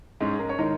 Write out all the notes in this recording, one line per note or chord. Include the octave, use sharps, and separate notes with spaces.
G#2 G#3 C#4 G#4
A#4
C#5
D#3 G#3 D#4 A#4